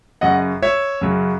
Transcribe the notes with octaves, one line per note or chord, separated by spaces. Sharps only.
F#2 C#3 F#3 D#5 F#5
C#5 E5
F#2 C#3 F#3